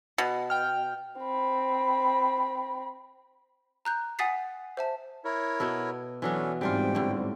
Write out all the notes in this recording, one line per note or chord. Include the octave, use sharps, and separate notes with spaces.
B2
G5 F6
C4 B5
A#5 F#6 G6
F#5 G#5 D#6 A6 B6 C7
C5 E5 A5
E4 A#4 C#5
B2 B3 A4
E3 F#3 B3 C#4 D4 A4
G#2 E3 G3 C4 D4 F4 G5
A2 D3